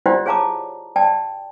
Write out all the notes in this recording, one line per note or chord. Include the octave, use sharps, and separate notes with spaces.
E4 F4 G4 C5 D5 F#5
G#4 C#5 F5 A5 A#5 D6
D5 G5 A5